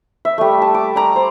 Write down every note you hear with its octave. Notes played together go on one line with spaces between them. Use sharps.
E5
G3 A3
A5
D6
D5 A#5
C5